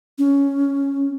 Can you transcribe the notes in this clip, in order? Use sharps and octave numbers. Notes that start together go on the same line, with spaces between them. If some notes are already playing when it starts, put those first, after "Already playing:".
C#4